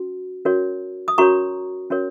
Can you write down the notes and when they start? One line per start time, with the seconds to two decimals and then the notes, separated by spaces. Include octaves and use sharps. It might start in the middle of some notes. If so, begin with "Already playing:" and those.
Already playing: C#4 F#4
0.45 C#4 F#4 A#4 C#5
1.08 D#6
1.18 C#4 F#4 A#4 C#5 A#5 C#6
1.90 C#4 F#4 A#4 C#5